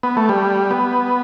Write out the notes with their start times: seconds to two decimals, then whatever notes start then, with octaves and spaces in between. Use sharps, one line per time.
0.03 B3
0.17 A3
0.29 G3
0.71 B3